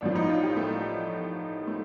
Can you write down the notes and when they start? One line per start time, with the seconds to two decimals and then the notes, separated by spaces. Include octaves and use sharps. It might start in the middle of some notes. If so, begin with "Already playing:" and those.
0.01 A1 A2 F3 D4
0.16 D#4
0.29 F4
0.43 G4
0.56 A3
1.67 A3